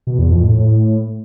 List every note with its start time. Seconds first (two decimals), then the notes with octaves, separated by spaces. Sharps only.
0.07 B2
0.19 E2
0.31 F2
0.42 A2